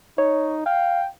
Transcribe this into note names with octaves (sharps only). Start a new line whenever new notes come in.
D#4 C#5
F5 G5